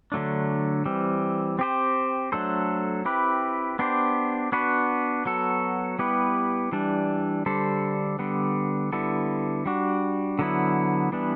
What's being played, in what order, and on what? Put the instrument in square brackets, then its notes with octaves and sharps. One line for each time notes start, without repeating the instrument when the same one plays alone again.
[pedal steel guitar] D3 F#3 A3 D4
E3 G3 C4
C4 G4 C5
F#3 A3 D4 A4 C5
C4 E4 G4 B4
B3 D4 G4 C5
B3 D4 F#4 B4
F#3 B3 F#4 A4
G3 B3 E4 G4 B4
E3 G3 D4
D3 G3 D4 A4 C5
D3 G3 B3
D3 G3 B3 E4 A4
G3 D4 F#4
D3 F#3 B3 E4
E3 G3 B3 D4